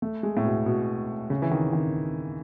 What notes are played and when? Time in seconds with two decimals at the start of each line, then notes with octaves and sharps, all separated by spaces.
0.02 A3
0.23 G#3
0.37 A2
0.45 B2
0.66 B2
1.30 C#3
1.42 E3
1.51 D#3
1.73 D#3